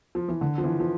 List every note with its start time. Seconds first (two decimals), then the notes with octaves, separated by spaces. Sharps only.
0.15 F3
0.28 E3
0.41 D3
0.58 F3
0.64 E3
0.80 F3